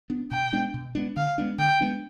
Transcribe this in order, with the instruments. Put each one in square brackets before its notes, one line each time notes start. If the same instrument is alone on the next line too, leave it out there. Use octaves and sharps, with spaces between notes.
[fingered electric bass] B3 D4
[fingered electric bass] B2 [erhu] G5
[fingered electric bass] G#3 B3 D4
B2
G#3 B3 D4
[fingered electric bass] D3 [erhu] F5
[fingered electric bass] G#3 B3 D4
[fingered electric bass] D3 [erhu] G5
[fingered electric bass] G#3 B3 D4